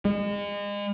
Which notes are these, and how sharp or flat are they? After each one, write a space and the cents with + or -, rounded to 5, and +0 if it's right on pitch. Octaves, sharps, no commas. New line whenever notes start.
G#3 -35